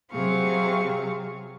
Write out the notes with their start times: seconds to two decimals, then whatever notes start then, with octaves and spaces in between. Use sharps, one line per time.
0.10 C3 F#3 C4 G#4 F5 C#6